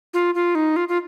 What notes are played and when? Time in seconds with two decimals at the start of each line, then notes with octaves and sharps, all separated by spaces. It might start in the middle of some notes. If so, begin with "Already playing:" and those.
0.14 F4
0.35 F4
0.55 D#4
0.76 F4
0.88 F4